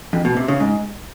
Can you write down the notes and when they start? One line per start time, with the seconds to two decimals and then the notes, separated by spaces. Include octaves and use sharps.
0.13 F2
0.25 B2
0.37 C3
0.48 C#3
0.60 G#2